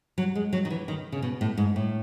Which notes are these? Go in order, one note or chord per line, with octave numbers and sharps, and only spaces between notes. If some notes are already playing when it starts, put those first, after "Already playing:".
F#3
G#3
F#3
D#3
E3
D#3
C#3
B2
A2
G#2
A2